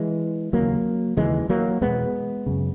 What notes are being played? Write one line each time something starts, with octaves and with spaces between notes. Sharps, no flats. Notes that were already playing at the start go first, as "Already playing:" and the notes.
Already playing: E3 G#3
D#2 C#3 F#3 A#3
D#2 C#3 E3 G#3
F#3 A#3
E2 B2 G#3 B3
F#2 C#3